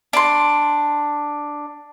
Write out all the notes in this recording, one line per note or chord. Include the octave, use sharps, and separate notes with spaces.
D4 C6